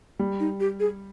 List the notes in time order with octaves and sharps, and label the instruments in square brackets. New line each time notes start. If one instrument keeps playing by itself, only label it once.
[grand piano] G3
[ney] D#4
G4
G#4